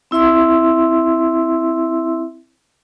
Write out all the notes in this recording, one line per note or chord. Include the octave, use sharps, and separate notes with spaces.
C4 E4 E5 C6 E6